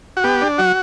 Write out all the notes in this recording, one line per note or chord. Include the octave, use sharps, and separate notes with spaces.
F#4
B3 G4
D4
F#3 F#4